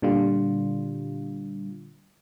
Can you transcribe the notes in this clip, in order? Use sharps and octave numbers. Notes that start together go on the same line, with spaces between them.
A#2 D3 G3 F4